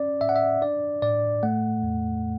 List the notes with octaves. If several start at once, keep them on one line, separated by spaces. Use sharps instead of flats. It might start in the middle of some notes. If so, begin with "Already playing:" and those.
Already playing: C#4 D5
A2 E5
F#5
E5
D4 D5
A2 D5
A3 F#5
E2